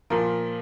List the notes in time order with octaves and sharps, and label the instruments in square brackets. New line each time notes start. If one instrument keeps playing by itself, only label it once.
[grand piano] A#2 F3 A#4